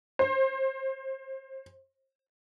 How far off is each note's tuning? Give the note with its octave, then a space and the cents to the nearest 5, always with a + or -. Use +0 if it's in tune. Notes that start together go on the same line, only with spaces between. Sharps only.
C5 +30